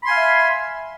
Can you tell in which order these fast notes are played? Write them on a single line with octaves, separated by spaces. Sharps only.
B5 C6 G#5 F5 E5